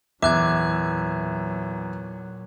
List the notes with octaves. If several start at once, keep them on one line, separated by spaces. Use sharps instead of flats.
E2 A#2 F#3 E5 D6 F#6 G#6